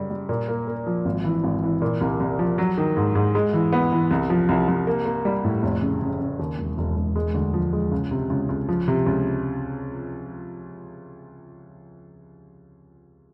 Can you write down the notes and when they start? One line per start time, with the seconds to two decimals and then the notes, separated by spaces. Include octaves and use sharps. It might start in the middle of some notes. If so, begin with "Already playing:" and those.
Already playing: F#2 C#3 G3
0.10 G3
0.29 A#2
0.48 A#3
0.68 A#3
0.86 F3
1.05 G#1
1.25 E3
1.44 G#1
1.63 E3
1.82 A#2
2.01 C2
2.20 C2
2.39 F3
2.58 F#3
2.78 D#3
2.97 G#2
3.15 G#2
3.35 G#3
3.53 E3
3.73 B3
3.92 E3
4.11 C2
4.30 F3
4.49 C2
4.68 C2
4.87 A#3
5.06 A#3
5.25 G3
5.44 A2
5.63 F1
5.82 C#3
6.01 C#3
6.21 C#3
6.39 D#2
6.58 E1
6.78 E1
6.96 E1
7.16 G#3
7.34 D2
7.54 F3
7.73 G#3
7.92 C#2
8.11 C3
8.30 C#2
8.49 C#2
8.68 F3
8.88 C3
9.07 C#2